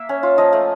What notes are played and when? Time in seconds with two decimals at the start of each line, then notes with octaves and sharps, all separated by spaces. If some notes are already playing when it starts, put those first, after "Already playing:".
Already playing: A#3 E5
0.09 C#4
0.23 F4
0.38 F3 D#5
0.53 A3